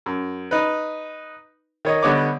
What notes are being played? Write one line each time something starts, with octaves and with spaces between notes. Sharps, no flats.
F#2
D#4 B4
D#3 C#5 D#5
D3 G3 B3 C#5 D#5 D6